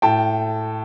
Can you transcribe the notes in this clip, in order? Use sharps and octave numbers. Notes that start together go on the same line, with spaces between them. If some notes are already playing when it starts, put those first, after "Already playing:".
A2 G5 A5